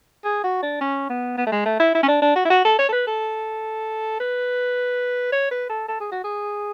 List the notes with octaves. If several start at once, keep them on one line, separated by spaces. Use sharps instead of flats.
G#4
F#4
D4
C#4
B3
B3
A3
G#3
A3
E4
E4
C#4
D4
D4
F#4
E4
F#4
A4
C#5
A4
B4
A4
B4
C#5
B4
A4
A4
G#4
F#4
G#4